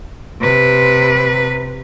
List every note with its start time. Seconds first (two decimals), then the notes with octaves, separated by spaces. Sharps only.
0.40 C3 B4